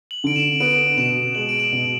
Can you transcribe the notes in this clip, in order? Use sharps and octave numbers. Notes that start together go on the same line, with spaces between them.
F#7
D3 D7
E7
B3 D7
B2 E7
G#3 F#7
D7
E7
B2